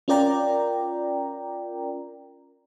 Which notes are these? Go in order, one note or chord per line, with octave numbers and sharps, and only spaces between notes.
C#4 F4 A#4 D5 G5 A#5